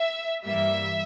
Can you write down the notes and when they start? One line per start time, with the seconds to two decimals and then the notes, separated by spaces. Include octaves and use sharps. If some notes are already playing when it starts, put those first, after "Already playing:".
Already playing: E5
0.44 G2 E3 G3 A#3 E5